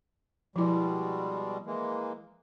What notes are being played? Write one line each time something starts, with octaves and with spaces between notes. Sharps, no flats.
B2 F3 G3 G#3 E4
E3 G#3 A#3